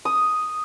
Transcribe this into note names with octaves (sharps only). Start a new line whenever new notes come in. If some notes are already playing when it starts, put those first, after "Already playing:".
D#6